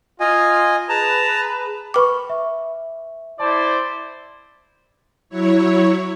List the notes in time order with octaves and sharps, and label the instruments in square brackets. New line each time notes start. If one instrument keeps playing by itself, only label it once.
[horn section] F4 [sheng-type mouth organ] D#5 G#5
[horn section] G#4 B4 [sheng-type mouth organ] A5 A#5
[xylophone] B4 D6 [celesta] G5 B5 C#6
[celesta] E5
[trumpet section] E4 C5 D5 [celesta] A5
[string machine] F#3 E4 C#5